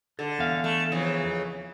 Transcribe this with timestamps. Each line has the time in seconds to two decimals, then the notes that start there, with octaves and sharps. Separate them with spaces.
0.19 D3 A4
0.39 E2 F5
0.64 A3
0.92 F2 C#3 E3